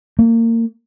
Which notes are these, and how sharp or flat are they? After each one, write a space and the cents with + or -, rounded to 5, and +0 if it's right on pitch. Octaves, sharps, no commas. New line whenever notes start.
A#3 -30